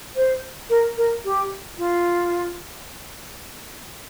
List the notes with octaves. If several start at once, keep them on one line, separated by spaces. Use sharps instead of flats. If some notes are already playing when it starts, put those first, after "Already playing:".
C5
A#4
A#4
G4
F4